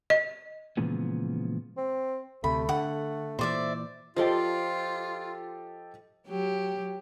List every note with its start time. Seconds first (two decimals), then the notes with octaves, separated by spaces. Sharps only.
0.10 D#5
0.77 A#2 C#3 E3 F3 G#3 B3
1.77 C4
2.44 D2 C3 A3 B5
2.69 D3 F#5
3.39 A#2 E3 C5 D5 E5
4.16 F3 F4 G4 A4 D5 D#5 C6
6.28 F#3 G4